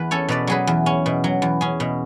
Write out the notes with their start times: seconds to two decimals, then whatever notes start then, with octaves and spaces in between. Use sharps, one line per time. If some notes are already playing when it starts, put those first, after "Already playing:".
Already playing: E2 B4
0.11 C#4 A4 C#5
0.29 B2 B4 D5
0.47 F#3 G#4 B4
0.67 E2
0.86 C#4
1.06 B2
1.24 F#3
1.42 E2
1.61 C#4 G#4
1.80 B2